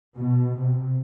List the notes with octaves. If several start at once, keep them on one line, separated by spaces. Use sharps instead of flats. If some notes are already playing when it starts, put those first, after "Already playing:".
B2
C3